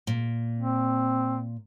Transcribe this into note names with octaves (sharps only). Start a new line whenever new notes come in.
A#2
C4